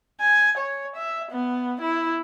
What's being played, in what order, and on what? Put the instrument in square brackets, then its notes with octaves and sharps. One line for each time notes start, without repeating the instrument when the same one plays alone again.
[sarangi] G#5
C#5
E5
B3
E4